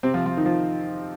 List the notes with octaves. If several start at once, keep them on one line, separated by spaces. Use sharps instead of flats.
C3 C4
F3 F4
F3 F4
D#3 D#4
F3 F4